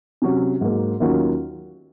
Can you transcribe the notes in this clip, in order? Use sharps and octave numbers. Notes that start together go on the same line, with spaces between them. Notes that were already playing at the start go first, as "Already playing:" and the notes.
C3 F#3 C#4
G#2 F#3 A#3
D#2 D#3 F#3 C#4 F4